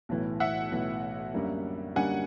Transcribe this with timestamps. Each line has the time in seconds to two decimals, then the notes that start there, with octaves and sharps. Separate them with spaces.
0.09 B1 A2 E3
0.40 E5 F#5
0.71 B1 A2 E3
1.34 F#2 D3 G3 A#3
1.96 F#2 D3 G3 A#3 F#5 G#5